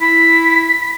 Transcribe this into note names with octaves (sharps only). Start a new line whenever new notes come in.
E4 B6